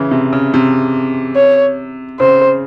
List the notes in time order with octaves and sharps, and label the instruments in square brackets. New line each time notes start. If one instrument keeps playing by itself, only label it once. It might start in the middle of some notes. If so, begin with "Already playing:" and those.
Already playing: [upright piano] C#3 E3
C3
C#3
C3
[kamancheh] C#5
[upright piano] C#3 [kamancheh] C5